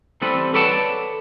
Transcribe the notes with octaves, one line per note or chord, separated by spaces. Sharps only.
E3 G3 C4 A4 B4
A4 B4 C#5 D5 F#5 A5